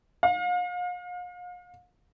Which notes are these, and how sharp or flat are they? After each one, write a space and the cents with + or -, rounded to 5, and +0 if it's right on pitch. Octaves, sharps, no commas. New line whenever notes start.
F5 +40